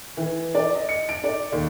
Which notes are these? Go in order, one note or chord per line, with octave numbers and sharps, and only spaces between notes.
E3
D5
D#5
C#7
D7
D5
D#2